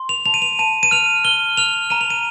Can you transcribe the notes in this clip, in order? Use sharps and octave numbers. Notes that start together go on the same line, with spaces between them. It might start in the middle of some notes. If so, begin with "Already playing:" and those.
Already playing: C6
F7
A5 F7
D#7
F7
A5 D#7
D#7
F6 F7
F6 G7
F6 F7
A#5 D#7
F7
D#7